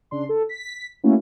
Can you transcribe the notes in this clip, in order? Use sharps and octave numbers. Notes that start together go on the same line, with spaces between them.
C#3 D4 C6
A4
B6
A3 A#3 C#4 E4 F#4